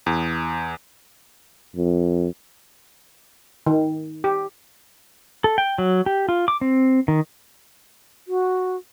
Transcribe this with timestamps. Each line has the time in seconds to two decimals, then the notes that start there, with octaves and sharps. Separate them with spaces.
0.06 E2
1.76 F2
3.66 D#3
4.24 G4
5.44 A4
5.58 G5
5.78 F#3
6.06 G4
6.29 F4
6.48 D6
6.61 C4
7.08 D#3
8.28 F#4